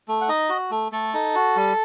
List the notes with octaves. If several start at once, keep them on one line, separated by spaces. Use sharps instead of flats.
A3
F#5
D#4 D#5
F#4
A3
A3 A4
D#4
F#4
G3